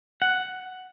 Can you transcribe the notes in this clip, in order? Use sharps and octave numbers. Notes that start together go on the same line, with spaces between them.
F#5